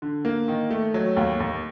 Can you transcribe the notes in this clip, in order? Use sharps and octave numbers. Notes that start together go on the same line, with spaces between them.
D3
A#3
D#3
A3
F#3
D#2
D#2